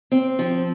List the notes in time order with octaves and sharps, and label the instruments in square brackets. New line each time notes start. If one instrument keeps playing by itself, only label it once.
[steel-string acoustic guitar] C4
F3